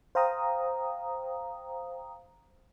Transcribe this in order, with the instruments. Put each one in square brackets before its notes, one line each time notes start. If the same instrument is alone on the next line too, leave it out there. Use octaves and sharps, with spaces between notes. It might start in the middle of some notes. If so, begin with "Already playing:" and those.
[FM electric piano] C5 F5 G5 A#5 D#6